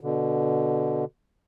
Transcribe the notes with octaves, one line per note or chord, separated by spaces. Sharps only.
B2 D3